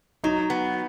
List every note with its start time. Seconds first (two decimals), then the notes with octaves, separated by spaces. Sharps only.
0.24 F#3 D#4
0.50 B3